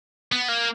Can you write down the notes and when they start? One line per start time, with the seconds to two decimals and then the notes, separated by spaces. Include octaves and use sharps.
0.32 B3
0.49 A#3